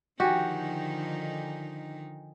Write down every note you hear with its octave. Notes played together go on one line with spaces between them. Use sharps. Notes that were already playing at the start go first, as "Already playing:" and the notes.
D3 D#3 F3 D#4 F#4 G4 G5 G#5